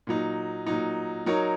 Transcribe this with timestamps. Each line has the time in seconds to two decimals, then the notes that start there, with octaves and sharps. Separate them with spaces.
0.07 A#2 F#3 D#4
0.66 A#2 F#3 D#4
1.26 F#3 D#4 A#4 C#5